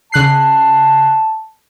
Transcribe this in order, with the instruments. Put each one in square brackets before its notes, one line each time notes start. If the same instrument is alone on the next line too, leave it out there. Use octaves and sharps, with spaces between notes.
[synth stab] C#3 F#6 C7 [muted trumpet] A5